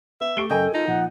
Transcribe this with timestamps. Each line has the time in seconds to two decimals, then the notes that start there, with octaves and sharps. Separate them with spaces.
0.21 B3 E5
0.37 A3 G4 C#6 D7 G7
0.50 F#2 C#3 A4 A#4 D#5 G5 G#5
0.74 D#4 F4 A4
0.88 A#2 F3 F#5